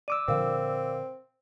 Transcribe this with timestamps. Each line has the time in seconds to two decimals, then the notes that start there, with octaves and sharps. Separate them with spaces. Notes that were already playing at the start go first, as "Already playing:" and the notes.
0.08 D5 D6 E6 D#7
0.28 A#2 D3 F3 C4 A#4 F5